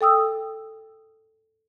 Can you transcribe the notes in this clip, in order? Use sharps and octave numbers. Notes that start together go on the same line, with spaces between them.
A4 G5 D#6 E6